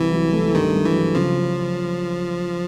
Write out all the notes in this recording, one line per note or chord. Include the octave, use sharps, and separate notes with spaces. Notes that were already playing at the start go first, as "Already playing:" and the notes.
Already playing: C2 E3
F#3
A3
G2 D#3
G2
E3
F#3
C#3 F3